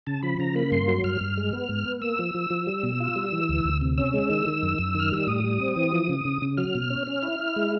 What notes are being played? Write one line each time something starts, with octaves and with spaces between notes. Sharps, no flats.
C#3 A5
F3 B5
C#3 A#5
A#3 B5
G2 C6
F#3
G2 F6
G2
G#3
B3
G#2
B3
A#3 E6
F3
F3
F3
G3
B2
F4
G3
E3
D2
D2
C3
C#4 E6
G#3
D#3
D#3
F#2
F#2
D#3 F6
G3 E6
A2 D#6
G3
C4
E3
F3
C#3
C#3
C#3
F#3 F6
B2
C#4
C#4
E4
E4
G#3